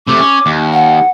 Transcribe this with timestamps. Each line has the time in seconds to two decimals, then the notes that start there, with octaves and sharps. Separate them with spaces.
0.07 C3 A3 D6
0.20 C#4
0.46 D#2
0.73 F#5